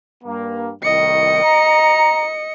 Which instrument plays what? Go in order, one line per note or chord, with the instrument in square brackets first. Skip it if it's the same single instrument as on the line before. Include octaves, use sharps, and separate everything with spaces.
[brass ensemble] G2 A#3
[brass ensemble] C2 A2 D#3 [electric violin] D#5 C#7
[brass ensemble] A#5